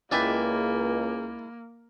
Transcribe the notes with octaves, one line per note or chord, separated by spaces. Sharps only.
C#2 G#3 A#3 E4 D5 G5 G#5